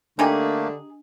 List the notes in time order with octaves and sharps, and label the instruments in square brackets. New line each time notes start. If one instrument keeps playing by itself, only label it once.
[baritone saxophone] D3 [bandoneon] A3 A#3 [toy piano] D4 [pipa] D#4 G4 G#4